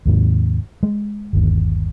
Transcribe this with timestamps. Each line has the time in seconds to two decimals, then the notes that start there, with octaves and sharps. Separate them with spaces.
0.06 D#2 G#2 C3
0.83 G#3
1.33 G1 D#2